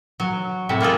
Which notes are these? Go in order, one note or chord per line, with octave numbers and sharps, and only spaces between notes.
F#3
A2 C3 E5
A#3 F4 G#4 A4